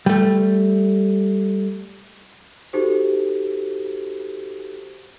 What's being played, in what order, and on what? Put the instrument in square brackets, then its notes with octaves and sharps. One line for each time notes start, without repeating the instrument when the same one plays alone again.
[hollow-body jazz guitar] G3 A3
[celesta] D#4 F#4 G4 A4 C5